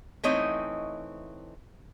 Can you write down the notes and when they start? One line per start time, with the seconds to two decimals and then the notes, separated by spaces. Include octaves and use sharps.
0.24 E3 A3 C4 D#4 C#5 D#5